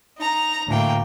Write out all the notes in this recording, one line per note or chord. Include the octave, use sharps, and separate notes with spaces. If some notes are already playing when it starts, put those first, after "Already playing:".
D#4 A#5
D2 A2 A#3 G5